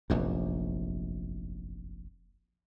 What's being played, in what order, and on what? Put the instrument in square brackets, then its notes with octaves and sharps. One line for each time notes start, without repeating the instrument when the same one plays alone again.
[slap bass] F1 A#1 F#2